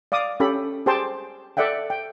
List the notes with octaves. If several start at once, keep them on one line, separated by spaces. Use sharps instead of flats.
D5 F5 D6 D#6
C#4 G4 A4 B5
G4 G#4 C5 G5 A5 C6
A4 D5 E5 F#5 G5
G5